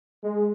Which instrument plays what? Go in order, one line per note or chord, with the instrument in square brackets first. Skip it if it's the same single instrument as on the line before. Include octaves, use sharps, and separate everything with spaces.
[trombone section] G#3